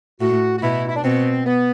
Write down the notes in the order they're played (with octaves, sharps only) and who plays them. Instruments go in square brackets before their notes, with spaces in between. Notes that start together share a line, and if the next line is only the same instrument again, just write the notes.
[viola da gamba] A2 [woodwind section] F#4
[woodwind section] F#4
[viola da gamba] B2 [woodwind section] E4
[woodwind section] E4
D4
[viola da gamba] B2 [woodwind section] C4
[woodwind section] B3